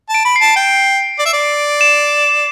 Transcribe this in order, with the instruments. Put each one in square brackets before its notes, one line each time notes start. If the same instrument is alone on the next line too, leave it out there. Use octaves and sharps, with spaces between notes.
[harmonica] A5
[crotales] D7
[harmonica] B5
[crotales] C7
[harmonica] A5
G5
D5
E5
D5
[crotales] E7